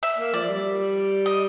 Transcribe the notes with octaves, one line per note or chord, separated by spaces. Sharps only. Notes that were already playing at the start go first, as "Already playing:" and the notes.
E5
A#3
F3 D5
G3
D#5